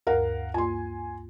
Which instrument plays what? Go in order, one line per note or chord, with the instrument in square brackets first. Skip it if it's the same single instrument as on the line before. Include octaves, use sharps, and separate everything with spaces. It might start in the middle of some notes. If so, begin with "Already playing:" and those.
[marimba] D2 G2 [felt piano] A#4 F5 F#5
[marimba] G2 A#3 F4 [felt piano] G#5 C6